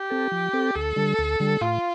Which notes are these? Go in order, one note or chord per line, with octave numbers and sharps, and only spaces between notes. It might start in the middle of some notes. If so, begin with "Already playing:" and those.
Already playing: G4
C4 A4
F3
C4 A4
D2 A4
D3 G3
D2
D3 G3
A2 F4